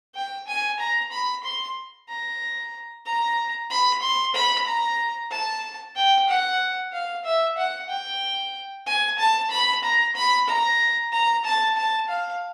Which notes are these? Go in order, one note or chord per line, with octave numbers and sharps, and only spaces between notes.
G5
G#5
A#5
B5
C6
A#5
A#5
B5
C6
B5
A#5
A5
G5
F#5
F5
E5
F#5
G5
G#5
A5
B5
A#5
B5
A#5
A#5
A5
A5
F5